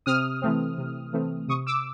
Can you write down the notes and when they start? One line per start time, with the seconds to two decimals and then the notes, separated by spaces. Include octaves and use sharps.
0.06 C3 D#6 F6
0.42 E3 A3 C4
0.78 C3
1.13 E3 A3 C4
1.48 C3 C#6 D#6
1.67 D6 E6